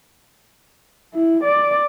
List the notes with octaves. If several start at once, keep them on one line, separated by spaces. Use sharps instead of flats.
E4
D5